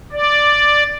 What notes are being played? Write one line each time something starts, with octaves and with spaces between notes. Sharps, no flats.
D5